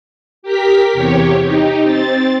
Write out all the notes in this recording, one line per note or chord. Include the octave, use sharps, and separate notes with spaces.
G4 A#4 B6
E2 C3 G4 C#5
D#4 G4
C4 A6